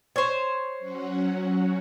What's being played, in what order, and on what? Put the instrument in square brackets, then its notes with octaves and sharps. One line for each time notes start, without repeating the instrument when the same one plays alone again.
[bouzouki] C5 C#5
[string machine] F#3 C#4 F#4